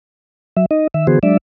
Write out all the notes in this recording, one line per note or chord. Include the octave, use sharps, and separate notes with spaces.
F#3 E5
D#4 D#5
D#3 E5
D3 E3 B3 F#4 G#4 C5
F#3 G#3 D4 D5 E5